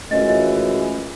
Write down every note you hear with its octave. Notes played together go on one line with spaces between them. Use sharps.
F#2 E3 G#3 A3 C#4 F4 D#5